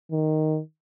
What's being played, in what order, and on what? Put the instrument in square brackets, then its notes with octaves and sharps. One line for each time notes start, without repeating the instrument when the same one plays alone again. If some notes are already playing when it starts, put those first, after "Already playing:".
[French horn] D#3